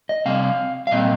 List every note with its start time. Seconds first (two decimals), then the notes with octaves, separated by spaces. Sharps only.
0.09 D#5
0.26 C3 G3 C4 F5
0.87 F5
0.91 A#2 G3 C4 D#5